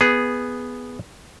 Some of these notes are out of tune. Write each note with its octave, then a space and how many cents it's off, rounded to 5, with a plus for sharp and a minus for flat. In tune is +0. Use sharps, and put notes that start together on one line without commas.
B3 +0 G#4 +0